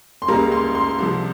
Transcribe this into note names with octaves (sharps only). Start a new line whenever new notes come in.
C6
C#2 C#3 G3 A#3 A#5
C6
C6
C2 C3 F3